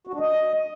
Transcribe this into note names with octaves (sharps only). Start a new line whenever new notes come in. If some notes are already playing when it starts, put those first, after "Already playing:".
F#4
D4
D#5